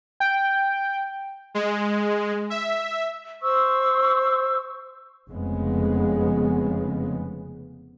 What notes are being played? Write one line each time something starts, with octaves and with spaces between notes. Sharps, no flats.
G5
G#3
E5
C5 C#6 E6
F1 F2 C#3 G#3 B3